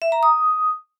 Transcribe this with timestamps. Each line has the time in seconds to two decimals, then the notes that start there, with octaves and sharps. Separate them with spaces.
0.02 E5
0.12 A#5
0.23 D#6